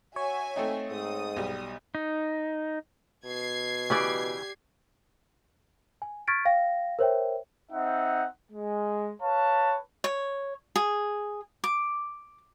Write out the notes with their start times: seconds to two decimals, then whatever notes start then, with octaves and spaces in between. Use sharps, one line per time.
0.16 F#4 C#5 E5 G#5
0.56 A3 C4 D#4
0.91 G#2 D#6
1.36 B1 G3
1.95 D#4
3.25 B2 G#6 C7
3.90 C#3 E3 G4 D5 G5
6.02 G#5
6.28 C#6 F6 G#6 A6 B6 D7
6.45 F5 G5 A#6
6.99 A#4 C5 C#5 E5 G5
7.71 C4 D#4 E5 F#5
8.52 G#3
9.22 B4 C#5 F5 A5
10.04 C#5
10.76 G#4
11.64 D6